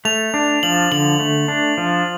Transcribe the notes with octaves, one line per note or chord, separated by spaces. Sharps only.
A3 F7
D4
F3 F#7
D3 F#7
A3
D4
F3